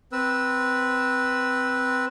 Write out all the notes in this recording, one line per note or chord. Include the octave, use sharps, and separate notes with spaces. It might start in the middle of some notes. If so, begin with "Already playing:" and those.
C4 B4 E6